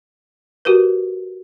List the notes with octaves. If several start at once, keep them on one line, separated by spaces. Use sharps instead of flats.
F#4 G4 A#4 B4